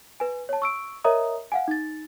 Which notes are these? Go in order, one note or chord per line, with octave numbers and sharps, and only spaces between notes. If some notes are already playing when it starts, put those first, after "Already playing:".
B4 G#5
C#5 A5
C#6 E6 D7
A#4 C#5 D#5 E5 A#5 D#6
F5 F#5 G#5
D#4 A6